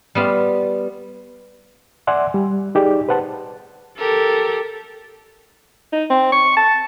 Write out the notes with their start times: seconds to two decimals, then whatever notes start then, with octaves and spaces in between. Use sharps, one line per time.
0.15 G3 B3 F4
2.07 D5 E5 F#5 G#5 C6
2.34 G3
2.75 D#4 G4 G#4 D5
3.09 B4 C5 F#5 A5
3.98 G4 A4 A#4
5.93 D#4
6.10 C4
6.32 C#6
6.57 A5